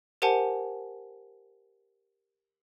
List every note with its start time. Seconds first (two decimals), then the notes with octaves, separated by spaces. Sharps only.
0.22 G4 A#4 C5 F#5 G#5 A5